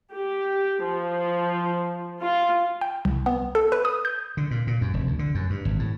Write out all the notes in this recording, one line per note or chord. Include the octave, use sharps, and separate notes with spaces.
G4
F3
F4
G5
C2
B3
A4
B4
D#6
G6
D3
A#2
A#2
F#2
F1
D2
D3
F#2
G2
G#1
A2